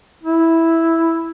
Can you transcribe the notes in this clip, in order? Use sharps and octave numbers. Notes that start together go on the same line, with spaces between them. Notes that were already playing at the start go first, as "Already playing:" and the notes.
E4